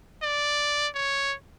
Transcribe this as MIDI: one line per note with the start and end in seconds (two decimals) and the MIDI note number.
0.23 0.88 74
0.95 1.34 73